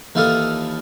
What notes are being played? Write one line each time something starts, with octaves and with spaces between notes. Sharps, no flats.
D#2 E3 F4 A4 F5 D#6